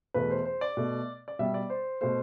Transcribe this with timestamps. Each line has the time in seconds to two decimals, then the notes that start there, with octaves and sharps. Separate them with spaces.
0.14 E2 B2 A3 B4
0.31 C5
0.45 C5
0.61 D5
0.77 B2 A3
1.28 D5
1.39 B2 G3 E5
1.54 D5
1.70 C5
2.01 B2 A3 C5